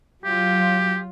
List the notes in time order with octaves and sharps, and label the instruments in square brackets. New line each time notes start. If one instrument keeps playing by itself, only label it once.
[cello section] F#3 F4 [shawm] G4